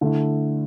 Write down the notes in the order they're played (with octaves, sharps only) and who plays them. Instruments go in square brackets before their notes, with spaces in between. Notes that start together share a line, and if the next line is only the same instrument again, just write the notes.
[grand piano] D3 A3 E4